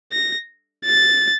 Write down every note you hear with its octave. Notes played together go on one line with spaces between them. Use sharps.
A#6
A6